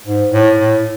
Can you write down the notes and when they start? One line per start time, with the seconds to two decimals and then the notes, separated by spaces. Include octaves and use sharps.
0.06 G#2
0.32 A2
0.57 A2